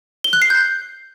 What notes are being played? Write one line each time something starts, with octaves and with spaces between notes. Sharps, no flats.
G7
F#6
C7
G6